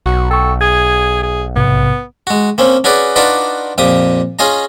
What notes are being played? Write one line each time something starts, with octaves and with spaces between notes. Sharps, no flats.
B1 F#4
A4 G5 C#6
G#4 G#6
G#4
A#1 G#2 C3 B3
G#3 F#4
A#3 C4 C#4
C#4 F#4 G#4 B4 D5
D4 D#4 F4 F#4 B4 D5
F2 A#2 G4 D#6
C#4 F4 G#4 D#5 A#5